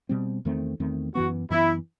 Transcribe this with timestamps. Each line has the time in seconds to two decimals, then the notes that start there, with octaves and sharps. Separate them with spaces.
0.09 B2 G3 C4
0.45 E2 D#3 A3 C4
0.80 E2 D#3 A3 C4
1.15 F#2 E3 B3 F#4
1.50 F#2 E3 B3 E4